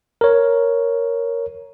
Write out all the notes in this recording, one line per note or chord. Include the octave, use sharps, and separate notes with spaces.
A#4 C#5